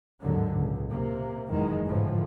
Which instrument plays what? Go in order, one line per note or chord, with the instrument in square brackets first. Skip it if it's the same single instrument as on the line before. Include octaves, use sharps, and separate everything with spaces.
[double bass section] G#1 D#2 A2 D3 F#3
C#2 A#2
C3 A#3
F#1 E2 D#3 G#3
G#1 A2 D3 E3 F3